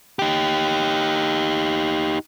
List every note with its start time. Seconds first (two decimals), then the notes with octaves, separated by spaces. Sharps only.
0.19 D#4 G4